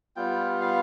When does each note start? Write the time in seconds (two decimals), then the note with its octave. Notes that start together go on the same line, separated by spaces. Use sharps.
0.16 G3 B3 F4 G5
0.61 F5